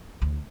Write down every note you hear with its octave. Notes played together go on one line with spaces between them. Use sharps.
D2